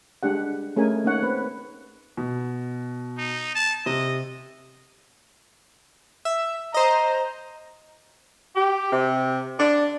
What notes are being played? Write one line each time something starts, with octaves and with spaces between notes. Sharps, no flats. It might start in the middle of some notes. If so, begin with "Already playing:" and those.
G#3 D4 G4 F#5
A3 C#4 G#4 A#4 G#5
A#3 C#4 D#4 C#5 F#5
C4 B4
B2
D#4
A5
C3 D#5
E5
C5 D#5 A#5
G4
C3
D4